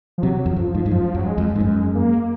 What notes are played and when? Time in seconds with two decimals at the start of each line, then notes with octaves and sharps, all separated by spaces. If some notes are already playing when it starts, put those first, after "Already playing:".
0.18 F3
0.23 C3 F#3
0.46 F2
0.56 F#2 F3
0.75 G#2
0.86 G#2
0.91 F#2 F3
1.15 F#2 F#3
1.26 G#3
1.38 F2
1.56 G#2
1.60 F#2 G#3
1.95 A#3